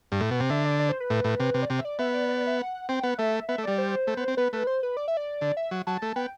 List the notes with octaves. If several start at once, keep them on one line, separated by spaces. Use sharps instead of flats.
G2
A2
B2
C3
D3 E5
D5
D5
C5
B4
A2
A2
C3
C3
D5
C3 C5
E5
D5
B3 E5
D5
D5
E5
F#5
C4 G5
B3 F#5
A3 E5
B3 E5
A3
G3 D5
C5
A3
B3
C4
B3 B4
A3 B4
C5
B4
D5
E5
D5
D3
E5
F#3
F#3 A5
A3
B3 G5